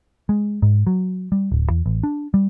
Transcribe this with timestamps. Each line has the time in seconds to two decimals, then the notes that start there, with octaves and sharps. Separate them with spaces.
0.29 G#3
0.62 G#2
0.87 F#3
1.32 G3
1.52 D1
1.70 E2
1.86 A1
2.04 D4
2.34 G3